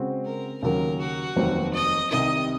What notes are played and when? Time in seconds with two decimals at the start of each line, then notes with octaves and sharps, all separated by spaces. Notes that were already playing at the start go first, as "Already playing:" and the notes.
Already playing: C#3 G#3 C4 F#4 C5
0.25 A#4
0.62 D#2 C#3 F#3 A#3 A#4
0.99 F#4
1.36 F1 D#2 D#3 F#3 C4
1.74 D#5
2.10 C2 C3 D#3 D#5